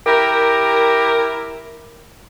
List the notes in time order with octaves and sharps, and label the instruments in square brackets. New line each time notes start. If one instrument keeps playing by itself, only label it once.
[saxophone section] E4 G4 A#4